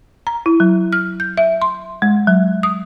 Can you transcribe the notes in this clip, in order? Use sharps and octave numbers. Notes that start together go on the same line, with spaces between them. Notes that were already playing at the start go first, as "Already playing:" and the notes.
A#5
E4
F#3
F6
G6
E5
C6
G#3
F#3
D#6